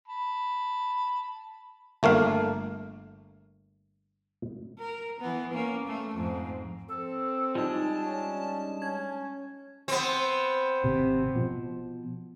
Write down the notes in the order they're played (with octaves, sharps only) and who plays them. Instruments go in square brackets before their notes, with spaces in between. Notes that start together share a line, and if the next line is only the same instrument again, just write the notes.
[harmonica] A5 B5
[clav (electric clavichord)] G1 A3 A#3 F5
[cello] A#4
E3 B3
A#3 C#4
A3
F2 G#2
[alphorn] C4 [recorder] A4
[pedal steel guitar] G3 G#3 D4 [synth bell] D#4 F4 [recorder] A5
[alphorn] C#4
[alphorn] C#4 [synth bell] G#6
[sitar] B3 C4
[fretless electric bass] G#1 C3
B2 F3